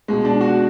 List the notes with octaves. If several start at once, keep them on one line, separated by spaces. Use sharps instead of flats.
C#2 B2 G#3
D4
F#4